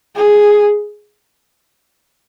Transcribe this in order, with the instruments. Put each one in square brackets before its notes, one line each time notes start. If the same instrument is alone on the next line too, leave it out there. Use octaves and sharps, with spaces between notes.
[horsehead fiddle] G#4